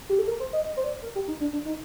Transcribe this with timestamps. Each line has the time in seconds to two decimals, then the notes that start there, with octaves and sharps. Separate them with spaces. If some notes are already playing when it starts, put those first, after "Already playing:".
0.09 G4
0.19 A4
0.28 A#4
0.40 C5
0.53 D#5
0.65 D#5
0.77 C5
0.84 D5
1.03 A#4
1.15 G4
1.28 D#4
1.40 D4
1.53 D4
1.66 D#4